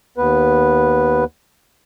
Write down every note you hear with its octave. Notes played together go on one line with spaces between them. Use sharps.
D#2 B3 B4